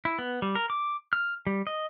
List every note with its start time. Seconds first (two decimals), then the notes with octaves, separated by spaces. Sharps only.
0.05 E4
0.19 B3
0.42 G3
0.55 A#4
0.70 D6
1.13 F6
1.47 G3
1.67 D#5